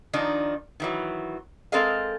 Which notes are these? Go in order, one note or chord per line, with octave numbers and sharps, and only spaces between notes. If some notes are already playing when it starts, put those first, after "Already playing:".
D#3 F3 D4 D#4
D#3 E3 F#3
G#3 C4 A4 A#4 D#5 F5